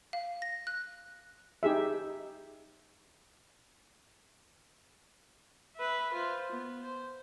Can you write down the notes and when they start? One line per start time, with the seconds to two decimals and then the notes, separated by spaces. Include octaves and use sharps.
0.13 F5
0.42 A#6
0.67 F#6
1.63 D#4 G4 G#4 E5
5.76 B4 E5
6.13 F4 C5
6.51 B3
6.82 C5